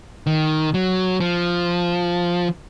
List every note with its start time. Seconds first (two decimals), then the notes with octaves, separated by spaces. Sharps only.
0.27 D#3
0.74 F#3
1.20 F3